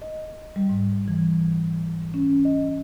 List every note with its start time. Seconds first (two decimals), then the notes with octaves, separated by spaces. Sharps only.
0.02 D#5
0.56 G3
0.69 G#2
1.08 E3
2.14 C#4
2.45 D#5